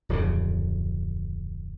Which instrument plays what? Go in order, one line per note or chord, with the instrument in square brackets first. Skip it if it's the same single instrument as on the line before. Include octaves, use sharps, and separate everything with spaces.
[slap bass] D1 F2 C#3